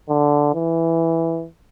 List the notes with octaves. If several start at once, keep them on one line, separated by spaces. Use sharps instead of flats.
D3
E3